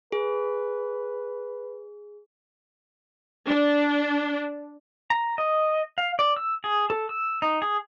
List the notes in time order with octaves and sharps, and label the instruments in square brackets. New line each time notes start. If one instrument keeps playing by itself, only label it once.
[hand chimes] G#4 [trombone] B4
[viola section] D4
[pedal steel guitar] A#5
D#5
F5
D5
E6
G#4
A4
E6
D#4
G#4